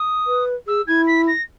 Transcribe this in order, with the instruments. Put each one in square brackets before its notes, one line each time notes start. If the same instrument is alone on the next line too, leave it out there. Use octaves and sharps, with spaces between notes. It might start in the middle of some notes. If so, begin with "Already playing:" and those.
Already playing: [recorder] D#6
[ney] B4
[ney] G#4 [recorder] E6
[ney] E4 [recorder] G#6
[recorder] B6
A#6